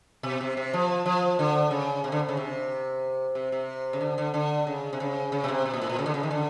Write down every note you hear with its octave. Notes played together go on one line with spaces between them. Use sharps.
B2
C3
C3
F3
F3
D3
C#3
C3
D3
C#3
C3
C3
C3
C#3
D3
D3
D3
C#3
C3
C#3
C#3
B2
C3
B2
A#2
A2
A#2
C#3
D3
C#3
D#3
D3